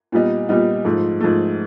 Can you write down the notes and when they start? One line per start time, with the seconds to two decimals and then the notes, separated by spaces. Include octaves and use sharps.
0.12 A#2 G3 B3 D#4
0.49 A#2 G3 B3 D#4
0.85 G#2 F3 A3
1.21 G#2 F3 A3